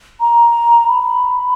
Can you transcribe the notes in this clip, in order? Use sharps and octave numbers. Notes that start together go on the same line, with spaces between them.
A#5
B5